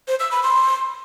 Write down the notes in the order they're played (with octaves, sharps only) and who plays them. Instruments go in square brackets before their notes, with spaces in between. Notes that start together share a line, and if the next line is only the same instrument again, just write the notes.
[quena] C5
E6
B5
C6